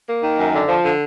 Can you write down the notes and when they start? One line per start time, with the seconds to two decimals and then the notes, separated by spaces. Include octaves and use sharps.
0.08 A#3
0.23 D#3
0.39 F#2
0.54 D3
0.68 F3
0.85 D3